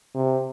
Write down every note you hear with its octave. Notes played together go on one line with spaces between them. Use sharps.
C3